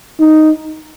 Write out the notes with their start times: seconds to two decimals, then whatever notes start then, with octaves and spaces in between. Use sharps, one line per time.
0.20 D#4